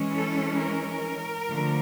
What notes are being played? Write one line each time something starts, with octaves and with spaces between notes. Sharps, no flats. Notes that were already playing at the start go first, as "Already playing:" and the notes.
Already playing: E3 G#3 C#4
A4
A#4
D3 F3 A3